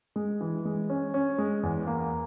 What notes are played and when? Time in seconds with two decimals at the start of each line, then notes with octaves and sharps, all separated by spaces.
0.16 G#3
0.41 E3
0.65 G#3
0.90 C#4
1.14 C#4
1.38 G#3
1.63 E2
1.87 A#3